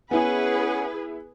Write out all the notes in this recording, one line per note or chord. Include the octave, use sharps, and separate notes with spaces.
B3 C#4 E4 G#4 B4 F#5 G#5